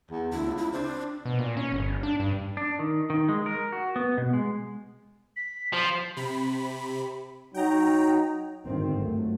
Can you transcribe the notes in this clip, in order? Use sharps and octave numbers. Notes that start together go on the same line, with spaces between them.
E2
D2 E4
C#2
E4
C4 D4
B2
A#2
C#4
G1
D4
G2
D4
D#3
D#3
G#3
A#4
F#4
B3
B2
G#3
B6
F3
C3 B5
F#3 D#4 G5 A#5
G#1 G2 D3 D#3 C4
C#2 F#3 A3